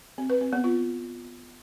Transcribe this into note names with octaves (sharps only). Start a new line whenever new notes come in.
C4
B4
C4
B3
F4